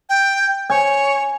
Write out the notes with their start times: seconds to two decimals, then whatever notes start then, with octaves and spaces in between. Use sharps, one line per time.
0.09 G5
0.70 C#5 G#5